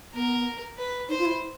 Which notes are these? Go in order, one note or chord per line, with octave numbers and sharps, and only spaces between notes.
B3 A#4
B4
D#4 C5
F4
E4